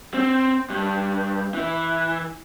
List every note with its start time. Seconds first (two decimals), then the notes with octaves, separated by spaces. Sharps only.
0.14 C4
0.70 G2
1.54 E3